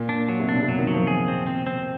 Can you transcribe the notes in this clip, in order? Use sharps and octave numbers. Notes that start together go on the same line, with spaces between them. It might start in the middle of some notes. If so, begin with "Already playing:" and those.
Already playing: A#2
D4
F#3
C3
B2 D4
C3
F#3
D#3
F#3
F3
G#4
C4
C4
C4